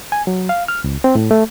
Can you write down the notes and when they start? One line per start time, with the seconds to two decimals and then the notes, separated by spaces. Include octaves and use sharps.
0.12 G#5
0.27 F#3
0.49 F5
0.68 F6
0.84 C#2
1.04 C4
1.15 A2
1.31 A3